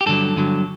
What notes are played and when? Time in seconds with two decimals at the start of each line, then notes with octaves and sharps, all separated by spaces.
0.01 G4
0.06 G2 D3 F#3 A4
0.36 G2 D3 F#3